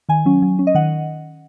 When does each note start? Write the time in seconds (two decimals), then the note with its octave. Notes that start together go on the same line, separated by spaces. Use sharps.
0.09 D#3 G#5
0.26 F#3 C#4
0.42 F#3
0.59 C#4
0.67 D#5
0.75 D#3 F#5